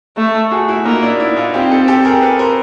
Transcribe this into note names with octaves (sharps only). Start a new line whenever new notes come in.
A3
F#4 G#4
E4 F#4
A#3 D#4 F4
D4 E4
D4 E4
D#4 F4
C4 F4 G4
G4 A4
G4 A4
G#4 A#4
A4 B4
A#4 C5